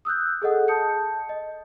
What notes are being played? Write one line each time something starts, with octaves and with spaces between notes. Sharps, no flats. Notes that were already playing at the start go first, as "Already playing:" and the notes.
D#6 E6 F#6 G6
G#4 A4 D#5 F#5
A5 D#6 G6 C#7
D#5